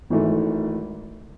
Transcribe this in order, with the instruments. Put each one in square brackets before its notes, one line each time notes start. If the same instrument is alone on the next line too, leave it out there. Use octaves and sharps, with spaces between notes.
[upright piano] G#1 G#2 E3 A3